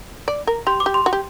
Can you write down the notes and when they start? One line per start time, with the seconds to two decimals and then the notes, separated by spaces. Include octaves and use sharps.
0.28 D5
0.47 A#4
0.67 G4 C6
0.80 D6
0.86 G4
0.94 C6
1.06 F#4
1.13 G4